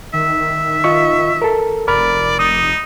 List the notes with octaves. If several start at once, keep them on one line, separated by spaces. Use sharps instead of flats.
D#3 E5
F4 D#5 C#6
A4 A#4
F1 A#4 D5 B5 F6
D#4 D#6